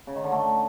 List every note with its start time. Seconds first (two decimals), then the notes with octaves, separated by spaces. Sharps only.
0.07 C#3
0.15 D#3
0.24 D3
0.32 A3